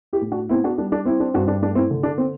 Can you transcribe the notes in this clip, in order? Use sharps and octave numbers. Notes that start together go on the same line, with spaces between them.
E4 G4
A2
D4 F#4
B3 C4 E4
D4 F#4
G3 D4
D4
C4 E4
D4
G2 D4 F#4
D4
A3 D4
C4 E4
D3
D4
C4